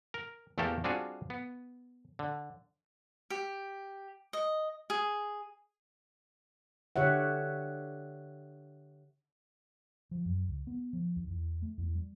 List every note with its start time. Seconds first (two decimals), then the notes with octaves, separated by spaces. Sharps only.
0.14 A#4
0.58 E2 A3 A#3 G4 A4 A#4
0.84 G3 C4 D4 F4 F#4 G#4
1.30 B3
2.19 D3
3.30 G4
4.33 D#5
4.90 G#4
6.96 D3 G4 C#5 E5 F#5
10.11 F3
10.25 F#2
10.48 C#2
10.67 B3
10.93 F3
11.16 D#2
11.30 E2
11.62 A3
11.78 E2
11.95 G3